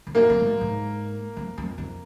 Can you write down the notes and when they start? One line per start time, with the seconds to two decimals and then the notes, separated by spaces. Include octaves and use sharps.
0.07 F2
0.15 F#2 A#3
0.30 F2
0.40 G#2
0.45 F#2
0.61 G#2
1.37 F2
1.58 F2
1.78 F2